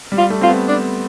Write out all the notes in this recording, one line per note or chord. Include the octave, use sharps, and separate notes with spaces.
G3
F4
A3
C4 F4
B3
D4